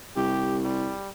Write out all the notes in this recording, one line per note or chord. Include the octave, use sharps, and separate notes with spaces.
C2 G4
G3